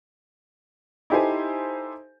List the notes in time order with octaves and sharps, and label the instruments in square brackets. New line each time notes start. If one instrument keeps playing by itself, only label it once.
[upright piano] D#4 E4 G4 A4 C5 G#5